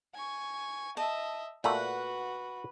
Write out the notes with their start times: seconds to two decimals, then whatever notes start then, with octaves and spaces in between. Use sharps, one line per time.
0.14 G#5 C#6
0.97 D#5 E5 A5
1.64 A#2 A3 F#4 B4 F#5